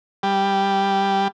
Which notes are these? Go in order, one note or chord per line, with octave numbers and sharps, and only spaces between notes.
G3